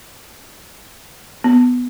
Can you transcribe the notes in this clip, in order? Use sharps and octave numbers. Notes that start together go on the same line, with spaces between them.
B3